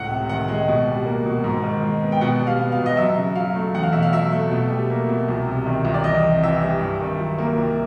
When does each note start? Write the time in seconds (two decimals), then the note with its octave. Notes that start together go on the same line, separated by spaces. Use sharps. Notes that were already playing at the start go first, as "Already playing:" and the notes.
Already playing: C#2 A2 F#5
0.10 C3
0.29 D#3 F#5
0.48 G#3
0.68 B2
0.87 G3
1.06 A#3
1.26 B2
1.44 G#2
1.63 D#3
1.82 G#3
2.02 B3
2.12 G5
2.21 B2 F#5
2.40 G3
2.47 F5
2.59 B3
2.72 F5
2.79 B2
2.86 D#5
2.97 F#2 E5
3.18 C#3
3.35 F#3 F5
3.55 A3
3.74 E2 F#5
3.83 F5
3.93 B2 E5
4.03 F5
4.13 F#3 E5
4.32 A3
4.51 B2
4.70 G3
4.90 A#3
5.09 B2
5.28 C2
5.47 C3
5.66 D#3
5.85 C2
5.94 D5
6.04 E2 D#5
6.23 C3
6.43 E3 E5
6.62 G3
6.81 G2
7.00 D#3
7.19 F#3
7.38 A#3
7.58 C2